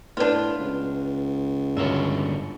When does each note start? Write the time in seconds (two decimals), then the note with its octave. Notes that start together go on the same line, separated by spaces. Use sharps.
0.17 A2 B3 D4 F4 B4 C5
0.60 C#2
1.77 G2 D3 F#4 A#4 C#5 E5